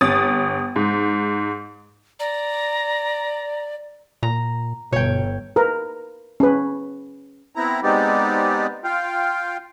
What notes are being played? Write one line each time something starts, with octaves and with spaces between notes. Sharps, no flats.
G1 D#6 A6
G#2
D5 A#5
A#2 A#5
G1 B2 C#5 G5
A#4 B4
C#4 B4
B3 C4 E4 A#5
G#3 B3 C4 D#4 G4 D5
F4 F5 G5